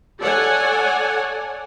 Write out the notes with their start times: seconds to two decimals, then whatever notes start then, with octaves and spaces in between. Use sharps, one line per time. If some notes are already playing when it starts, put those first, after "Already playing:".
0.21 A4 C#5 D5 F#5 G#5